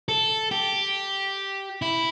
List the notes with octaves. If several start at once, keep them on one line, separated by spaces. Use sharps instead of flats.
A4
G4
E4